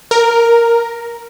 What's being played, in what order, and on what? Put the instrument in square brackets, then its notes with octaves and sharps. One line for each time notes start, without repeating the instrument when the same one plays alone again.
[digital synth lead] A#4